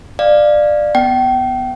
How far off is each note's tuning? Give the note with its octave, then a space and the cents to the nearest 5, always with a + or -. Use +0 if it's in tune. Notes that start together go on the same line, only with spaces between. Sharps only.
D5 +20 F5 +0
B3 +0 G5 -35